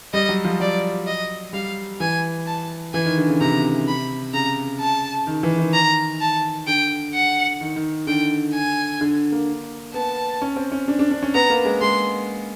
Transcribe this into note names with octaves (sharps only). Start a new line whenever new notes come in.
G3 D#5
F#3
F3
F#3 D5
D#5
G3 F5
E3 G#5
A5
E3 G#5
D#3
D3
C#3
C3 A#5
B5
C#3 A#5
A5
D#3
E3
D#3
A#5
A5
D3 G5
F#5
D#3
D#3
D3 G5
G#5
D3
A#3
B3 A5
C#4
C4
C#4
D4
D4
D4
C#4
B3 A#5
A#3
G#3
G#3 C6